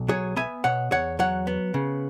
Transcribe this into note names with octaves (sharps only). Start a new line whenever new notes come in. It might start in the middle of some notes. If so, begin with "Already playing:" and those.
Already playing: B1
F#3 G#4 C#5
B3 E5 G#5
B2 C#5 F#5
E2 C#5 F#5
F#3 C#5 F#5
B3
C#3